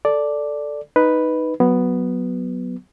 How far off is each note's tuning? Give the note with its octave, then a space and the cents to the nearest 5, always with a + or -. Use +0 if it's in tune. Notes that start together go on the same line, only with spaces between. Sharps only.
A4 +0 D5 +0
D#4 +0 B4 +0
F#3 +0 B3 +0